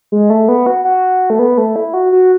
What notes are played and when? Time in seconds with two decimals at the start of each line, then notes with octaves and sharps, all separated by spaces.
0.12 G#3
0.30 A3
0.48 B3
0.66 F#4
0.85 F#4
1.30 A3
1.39 B3
1.58 A3
1.76 E4
1.94 F#4
2.12 F#4